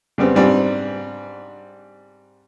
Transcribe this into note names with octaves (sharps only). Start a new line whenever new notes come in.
C#3 G3 B3 C4
G#2 G3 C4 D4